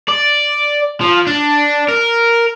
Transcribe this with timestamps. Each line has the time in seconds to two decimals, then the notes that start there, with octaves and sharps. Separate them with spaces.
0.09 D5
1.01 F3
1.27 D4
1.88 A#4